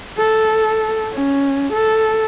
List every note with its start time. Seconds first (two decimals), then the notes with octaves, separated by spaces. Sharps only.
0.18 A4
1.13 C#4
1.73 A4